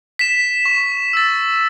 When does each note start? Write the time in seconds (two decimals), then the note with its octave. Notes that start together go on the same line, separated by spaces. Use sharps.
0.19 B6 E7
0.66 C#6
1.13 E6 A6